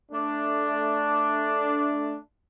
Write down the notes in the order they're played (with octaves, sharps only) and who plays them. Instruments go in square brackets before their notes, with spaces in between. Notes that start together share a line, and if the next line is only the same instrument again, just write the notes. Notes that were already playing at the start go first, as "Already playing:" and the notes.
[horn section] A3 D4